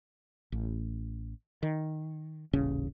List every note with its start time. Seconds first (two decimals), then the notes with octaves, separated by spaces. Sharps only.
0.52 A1
1.63 D#3
2.53 D#1 A1 C#3 C#4